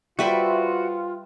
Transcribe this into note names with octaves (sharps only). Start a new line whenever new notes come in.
G3 F4 F#4 B4 C5 E5